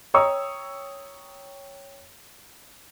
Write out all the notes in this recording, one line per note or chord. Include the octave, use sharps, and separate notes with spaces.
C#5 G5 A#5 C#6 D#6 E6